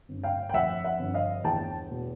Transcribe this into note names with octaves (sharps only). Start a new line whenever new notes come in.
G1
F5 G5
G5
F2 E5 F#5
E5 F#5
G1
D#5 F5
E2 G5 A5
B2